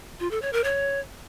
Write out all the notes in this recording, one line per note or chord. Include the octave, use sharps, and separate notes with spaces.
F4
A4
C#5
A#4
C#5